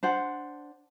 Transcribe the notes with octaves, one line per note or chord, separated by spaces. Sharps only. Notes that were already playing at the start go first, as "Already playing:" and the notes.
D4 C5 F#5